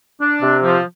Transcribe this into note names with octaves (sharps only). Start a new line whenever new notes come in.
D4
C3
F3